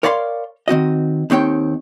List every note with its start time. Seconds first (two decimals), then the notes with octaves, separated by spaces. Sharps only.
0.03 A#4 C#5 D5 F5 A#5 C6
0.68 D#3 C4 F#4 D#5
1.30 D#2 D#3 C4 C#5 G5